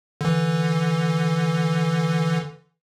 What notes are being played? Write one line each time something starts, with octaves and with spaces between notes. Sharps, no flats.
D3 E3